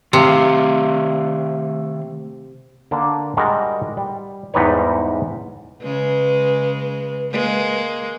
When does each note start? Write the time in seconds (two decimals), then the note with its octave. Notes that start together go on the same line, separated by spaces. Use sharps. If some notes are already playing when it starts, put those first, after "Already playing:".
0.13 C3 D#3 A3 F5
2.91 D3 A#3 D4
3.37 G3 G#3 F#4 A#4
3.97 G3
4.54 E2 G#2 G3 D#4 B4 C#5
5.83 C#3 G#3 B4
7.32 G#3 A#3